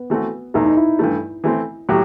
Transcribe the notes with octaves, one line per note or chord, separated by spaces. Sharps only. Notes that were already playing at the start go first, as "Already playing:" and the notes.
Already playing: B3
E3 A3 C4 F#4
E2 B2 A3 D#4
D#4
E4
G2 E3 A3
E3 A3 C4
A2 F#3 G4